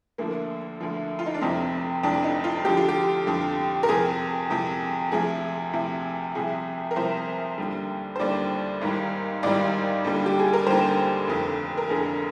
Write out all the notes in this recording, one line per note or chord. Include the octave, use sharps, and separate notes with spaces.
D2 D3 F3 A#3
D2 D3 F3
F4
D#4
D4
F1 F2 C3 F3 C4
F1 F2 C3 F3 D4
D#4
F4
F2 D3 F3 G4
F4
G4
F2 D3 F3
A#4
F2 C3 F3 G#4
F2 C3 F3
D2 C3 F3 G#4
D2 C3 F3
C2 C3 F3 G#4
A#4
C2 C3 F3 C5
D#2 D3 G3
C5
D#2 D3 G3 D5
G#1 G#2 D#3 G3
G#1 G#2 D#3 G3 D5
D#2 D3 G3
G4
G#4
A#4
D#2 D3 G3 C5
F1 F2 D3
A#4
F1 F2 D3 G#4